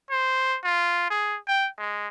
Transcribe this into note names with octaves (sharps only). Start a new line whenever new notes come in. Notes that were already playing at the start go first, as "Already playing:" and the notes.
C5
F4
G#4
G5
G#3